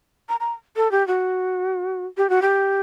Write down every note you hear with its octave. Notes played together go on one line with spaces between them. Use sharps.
A#5
A#5
A4
G4
F#4
G4
F#4
G4